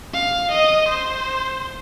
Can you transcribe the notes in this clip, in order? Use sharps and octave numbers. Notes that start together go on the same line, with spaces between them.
F5
D#5
C5